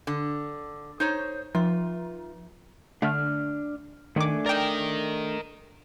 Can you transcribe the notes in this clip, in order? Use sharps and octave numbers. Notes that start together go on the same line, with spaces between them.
D3
D#4 C5 C#5
F3 F4
D3 A3 D4 F6
D#3 A3 D4 G#5 D6
A#4 D5 D#5 G5